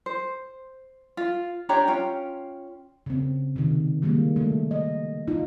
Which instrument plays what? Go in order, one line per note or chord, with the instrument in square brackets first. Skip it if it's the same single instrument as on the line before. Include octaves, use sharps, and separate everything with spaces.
[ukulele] C5
F4
D4 G4 C#5 A#5
C#4 F4 G5
[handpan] C#3 C4
C3 D#3
D#3 G3 G#3 A#3
A3
D#5
D#4 F4